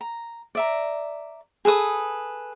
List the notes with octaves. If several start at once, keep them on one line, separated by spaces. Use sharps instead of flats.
A#5
D5 E5 A#5
G#4 A4 B4 D#6